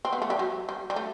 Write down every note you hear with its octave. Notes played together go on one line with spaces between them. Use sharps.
C4
B3
A3
G3
F#3
G3
G3
A3